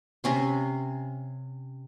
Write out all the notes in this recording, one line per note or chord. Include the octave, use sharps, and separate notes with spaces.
C3 C#4 C6